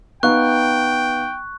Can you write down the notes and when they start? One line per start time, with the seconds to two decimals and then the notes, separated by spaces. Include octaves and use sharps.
0.23 B3 D#4 F5 G5 C#6 F#6